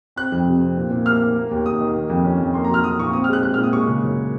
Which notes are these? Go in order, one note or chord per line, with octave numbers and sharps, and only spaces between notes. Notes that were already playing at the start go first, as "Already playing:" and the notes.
C4 F#6
F2
C3
C4
A#2
A#2
A#3 F6
A#3
A#3
D#2
D#2 D#6
D#3
A#3
F2
C#4
F2
A#3 C6
A#5
F#3
F6
F#3 D#6
A#2 C#6
C4 D#6
F6
G#3 F#6
G#3 F#6
F6
A#2
D#6
G#3 C#6
C#3
F#2